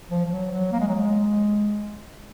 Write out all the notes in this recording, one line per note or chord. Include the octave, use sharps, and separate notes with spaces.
F3
F3
F#3
F#3
A#3
G#3
F#3
G#3